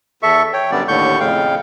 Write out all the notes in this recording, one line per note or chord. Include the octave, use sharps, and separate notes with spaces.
E2 A4 E5 C#6
C#5 G5
F#2 D3 G3 B3 D5
D#2 A2 D3 C#6 G6
F2 A2 C#3 F5 G5